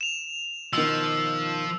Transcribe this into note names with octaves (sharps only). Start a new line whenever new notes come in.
E7 F7
B2 D#3 F3 E6